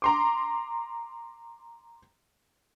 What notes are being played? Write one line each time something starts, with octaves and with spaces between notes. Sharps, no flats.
A#5 C6 D6